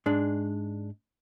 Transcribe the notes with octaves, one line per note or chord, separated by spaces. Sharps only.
G#2 G#3 D4